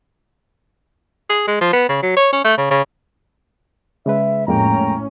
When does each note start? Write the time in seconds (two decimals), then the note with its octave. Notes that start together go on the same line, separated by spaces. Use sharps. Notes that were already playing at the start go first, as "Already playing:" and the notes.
1.29 G#4
1.47 G#3
1.61 F3
1.73 B3
1.89 C#3
2.03 F#3
2.17 C#5
2.32 C#4
2.44 A3
2.58 C#3
2.70 C#3
4.06 C#3 G#3 B4 E5
4.48 F2 A2 G#3 A#3 C#4 G5 A#5